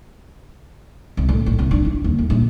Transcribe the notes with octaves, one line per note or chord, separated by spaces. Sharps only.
C2
A2
A1
C2
D4
E4
D#2
D#2
A#1